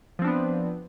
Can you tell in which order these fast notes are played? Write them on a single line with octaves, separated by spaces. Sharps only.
F3 C4 D4 B3